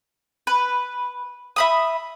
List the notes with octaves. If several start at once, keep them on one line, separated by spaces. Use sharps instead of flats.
B4
E5 B5 D#6